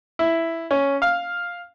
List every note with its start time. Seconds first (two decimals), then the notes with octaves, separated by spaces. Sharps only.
0.19 E4
0.71 C#4
1.02 F5